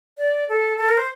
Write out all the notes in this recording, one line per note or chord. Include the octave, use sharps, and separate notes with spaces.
D5
A4
A4
A#4
C5